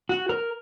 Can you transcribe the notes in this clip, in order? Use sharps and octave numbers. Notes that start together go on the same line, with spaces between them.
F#4
A#4